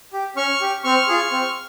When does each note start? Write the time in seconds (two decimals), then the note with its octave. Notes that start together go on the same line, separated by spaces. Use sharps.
0.13 G4
0.36 C#4 C#6 F6
0.61 G4
0.84 C4 C#6 F6
1.08 F4 G#4
1.31 C4